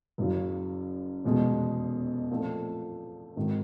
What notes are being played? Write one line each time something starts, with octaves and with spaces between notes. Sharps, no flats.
F#1 F#2 C#3 F#3
F1 E2 B2 G#3
A#2 F3 A3 C4
G#1 G#2 D#3